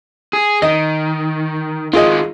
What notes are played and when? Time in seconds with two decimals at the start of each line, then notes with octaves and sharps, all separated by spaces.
0.33 G#4
0.62 D#3 D#5
1.93 D#3 G#3 F4 G#4 D#5